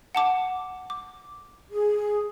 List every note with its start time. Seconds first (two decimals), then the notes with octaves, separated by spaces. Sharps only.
0.15 F#5 A5 D6
0.90 D6
1.72 G#4